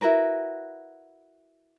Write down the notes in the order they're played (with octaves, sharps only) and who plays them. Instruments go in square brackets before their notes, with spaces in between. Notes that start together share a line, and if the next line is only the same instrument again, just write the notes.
[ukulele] E4 F#4 A#4 B4